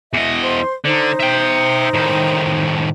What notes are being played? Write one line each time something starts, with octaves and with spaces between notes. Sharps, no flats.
E2 D#5 E5
C5 C6
D3 D#4 C5
E5 G5
A2 D#3